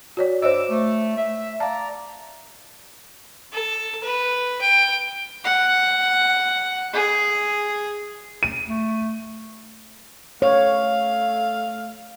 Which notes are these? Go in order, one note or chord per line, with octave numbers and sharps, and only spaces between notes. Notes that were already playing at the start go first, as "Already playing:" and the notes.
F#4 C#5 D5
G2 C5 C#5 D#5 D6 E6
A3
E5
D5 F5 A5 A#5
A4
B4
G5
F#5
G#4
D#7
A3
A3 C#5 F5